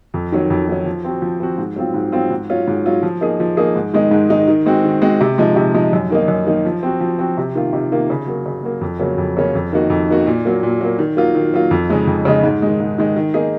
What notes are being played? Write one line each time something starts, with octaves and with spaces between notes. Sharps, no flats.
F2
D#3 F#3 C#4
F2
D#3 F#3 C#4
F3
C4 F#4
F3
C4 F#4
G#2
F#3 C4 F4
G#2
F#3 C4 F4
G#2
F#3 C#4 F4
G#2
F#3 C#4 F4
F3
A#3 D#4 G#4
F3
A#3 D#4 G#4
G#2
D#3 G#3 D#4
G#2
D#3 G#3 D#4
D#3
G#3 C4 F#4
D#3
G#3 C4 F#4
C3
F3 G#3 D#4
C3
F3 G#3 D#4
F#2
D#3 A#3 D#4
F#2
D#3 A#3 D#4
F3
C4 F#4
F3
C4 F#4
C3
D#3 A#3 F4
C3
D#3 A#3 F4
C#3
F#3 A#3
C#3
F#3 A#3
F2
C#3 F#3 A#3 C#4
F2
C#3 F#3 A#3 C#4
F2
D#3 A#3 D#4 F#4
F2
D#3 A#3 D#4 F#4
A#2
F#3 A#3
A#2
F#3 A#3
D#3
F#3 A#3 F4
D#3
F#3 A#3 F4
F2
C#3 G#3 D#4
F2
C#3 G#3 D#4
G#2
D#3 G#3
G#2
D#3 G#3
D#3
A#3 D#4 G#4